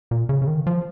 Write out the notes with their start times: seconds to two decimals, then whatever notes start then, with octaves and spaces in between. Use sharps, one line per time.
0.11 A#2
0.29 C#3
0.42 C#3
0.47 D#3
0.67 F3